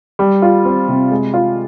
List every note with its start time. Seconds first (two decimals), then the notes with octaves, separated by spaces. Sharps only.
0.19 G3
0.42 F4
0.65 C4
0.88 C3
1.11 G#3
1.34 F4